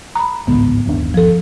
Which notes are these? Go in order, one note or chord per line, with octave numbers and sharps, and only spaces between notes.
A#5 B5
A1 D2 G#2 B3
G1 D#2 D4
F3 A4